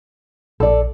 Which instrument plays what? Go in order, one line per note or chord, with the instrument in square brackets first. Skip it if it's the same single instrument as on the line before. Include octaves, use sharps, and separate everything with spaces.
[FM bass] A#1 [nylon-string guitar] A4 D5